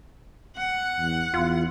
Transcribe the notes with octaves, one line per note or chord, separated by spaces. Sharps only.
F#5
E2
E2 F4